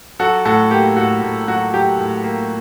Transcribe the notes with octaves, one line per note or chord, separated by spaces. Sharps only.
F#3 F#4 A4
A2 F#4 A4
A#3 G4
A2 F#4
A2
F#3 F#4
F#3 G4
A2
A#3